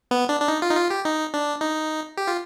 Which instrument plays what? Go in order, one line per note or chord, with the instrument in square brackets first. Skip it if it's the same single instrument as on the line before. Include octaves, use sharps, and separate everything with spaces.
[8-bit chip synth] B3
D4
D4
D#4
F4
D#4
F4
G4
D#4
D4
D#4
G4
F4